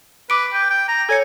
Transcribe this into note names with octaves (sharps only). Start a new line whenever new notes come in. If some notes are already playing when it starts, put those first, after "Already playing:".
B4 D6 D7
G5
G5
A#5
A4 C#5 G#5 C#7